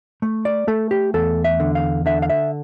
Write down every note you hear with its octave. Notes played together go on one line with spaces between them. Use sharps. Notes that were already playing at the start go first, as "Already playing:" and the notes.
A3
D5
A3 A4
G4
E2 A4
E5
D3
F5
D3 E5
F5
E5